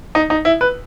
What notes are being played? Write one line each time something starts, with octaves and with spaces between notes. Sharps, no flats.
D#4
D#4
E4
B4